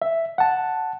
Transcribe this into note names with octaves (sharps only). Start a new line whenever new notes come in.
E5
F#5 A5